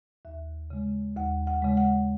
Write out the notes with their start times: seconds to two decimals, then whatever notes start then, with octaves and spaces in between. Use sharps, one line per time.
0.25 D#2 E5
0.70 C#3 G#3
1.16 D#2 F#5
1.47 F#5
1.62 C#3 G#3
1.77 F#5